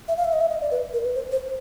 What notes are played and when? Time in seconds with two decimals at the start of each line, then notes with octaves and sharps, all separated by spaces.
0.08 E5
0.17 F5
0.25 E5
0.33 D#5
0.41 E5
0.50 D#5
0.61 D5
0.71 B4
0.93 A#4
1.05 B4
1.15 C5
1.32 C5